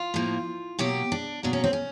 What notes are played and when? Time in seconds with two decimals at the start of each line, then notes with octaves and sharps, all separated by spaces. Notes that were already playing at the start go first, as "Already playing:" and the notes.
Already playing: F4
0.14 A2 F3 A#3
0.79 B2 F#3 A#3 G4
1.12 D4
1.43 B2 F#3 A#3 D4
1.53 C#4
1.64 C4
1.73 C#4